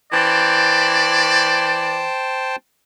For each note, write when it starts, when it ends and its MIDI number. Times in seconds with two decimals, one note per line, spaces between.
0.13 2.07 52
0.13 2.56 72
0.13 1.99 74
0.13 2.56 79
0.13 2.56 81